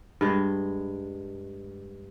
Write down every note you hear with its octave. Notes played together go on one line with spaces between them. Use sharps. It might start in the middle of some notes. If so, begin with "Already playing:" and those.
G2 G#3